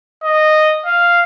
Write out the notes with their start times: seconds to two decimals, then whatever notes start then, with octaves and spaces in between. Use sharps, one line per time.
0.23 D#5
0.85 F5